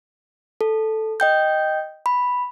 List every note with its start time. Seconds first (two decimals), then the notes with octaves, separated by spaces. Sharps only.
0.61 A4
1.20 D#5 G5 G6
2.06 B5